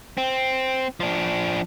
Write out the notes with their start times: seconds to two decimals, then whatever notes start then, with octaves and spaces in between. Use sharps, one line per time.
0.17 C4
1.00 F3 D4